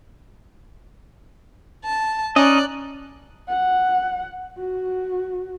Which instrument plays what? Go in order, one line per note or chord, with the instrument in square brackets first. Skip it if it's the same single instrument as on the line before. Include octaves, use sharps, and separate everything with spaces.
[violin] A5
[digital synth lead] C#4 [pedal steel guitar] D#4 D#5 [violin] D5 F#6
[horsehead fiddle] F#5
F#4